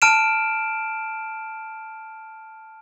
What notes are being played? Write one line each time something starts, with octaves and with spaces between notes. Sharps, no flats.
A5 F6 D7 E7